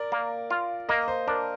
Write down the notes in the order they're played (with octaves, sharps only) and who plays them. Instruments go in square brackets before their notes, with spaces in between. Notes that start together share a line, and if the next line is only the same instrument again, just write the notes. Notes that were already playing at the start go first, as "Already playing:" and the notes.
Already playing: [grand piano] A#4 D5
[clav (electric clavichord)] A#3
F4
[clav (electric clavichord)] A#3 [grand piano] D#5
[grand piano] C5
[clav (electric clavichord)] D4 [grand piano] A#4